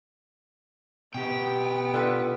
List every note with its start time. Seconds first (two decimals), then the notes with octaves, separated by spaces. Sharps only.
1.14 B2 B3 G4 G5
1.94 D3 F4 B4